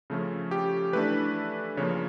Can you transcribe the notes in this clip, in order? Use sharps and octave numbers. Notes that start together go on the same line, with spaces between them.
C#3 F3 A3 C#4
G4
E3 A3 D4 B4
C#3 F3 A#3 C#5